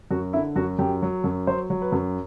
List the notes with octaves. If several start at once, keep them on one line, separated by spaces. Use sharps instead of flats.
F#2 F#4
D3 E4
F#2 F#4
F#2 G4
F#3
F#2
F#3 C5
F#3
B4
F#2